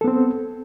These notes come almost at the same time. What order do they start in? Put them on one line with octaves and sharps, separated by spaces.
A4 B3 C4